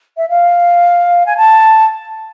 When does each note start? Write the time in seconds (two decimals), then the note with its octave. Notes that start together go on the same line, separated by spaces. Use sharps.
0.17 E5
0.29 F5
1.26 G#5
1.36 A5